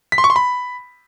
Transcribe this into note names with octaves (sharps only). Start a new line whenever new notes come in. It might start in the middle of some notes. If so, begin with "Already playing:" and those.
B6
C6
C#6
C6
B5